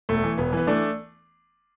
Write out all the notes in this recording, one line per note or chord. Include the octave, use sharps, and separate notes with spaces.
E1 A3
E3
E1 B3
E3 B3
E3 A3 D4